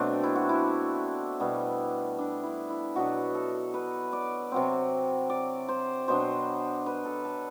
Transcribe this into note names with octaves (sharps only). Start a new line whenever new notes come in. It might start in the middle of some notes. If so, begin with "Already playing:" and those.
Already playing: B2 F#3 A3 C4 D4
E4
F#4
E4
B2 G3 B3 D4
D4
E4
E4
B2 F#3 B3 D4 F#4
A4
B4
D5
C3 F#3 C4
D5
C5
B2 F#3 B3 D4 C5
B4
A4
A4